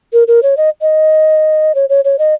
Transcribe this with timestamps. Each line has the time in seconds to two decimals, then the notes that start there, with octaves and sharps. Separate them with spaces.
0.13 A#4
0.28 A#4
0.43 C#5
0.57 D#5
0.82 D#5
1.75 C#5
1.89 C#5
2.05 C#5
2.19 D#5